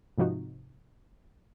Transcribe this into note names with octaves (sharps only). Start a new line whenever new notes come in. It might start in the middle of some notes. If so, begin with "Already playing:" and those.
G#2 C3 F3 D#4 F#4